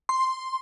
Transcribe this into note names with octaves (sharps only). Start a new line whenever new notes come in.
C6